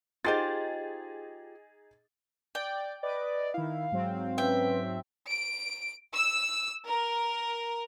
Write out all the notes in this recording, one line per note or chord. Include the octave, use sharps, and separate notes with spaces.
D#4 F4 G4 G#4 C5 A6
D5 G5
B4 D5 D#5 D6
D#3 E4 F5
G#2 F#3 C4
C#4 B4 E5 G5
D7
E6
A#4